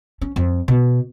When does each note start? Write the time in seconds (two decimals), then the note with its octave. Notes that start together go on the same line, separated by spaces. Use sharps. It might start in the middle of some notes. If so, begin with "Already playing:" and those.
0.21 C#4
0.36 F2
0.68 B2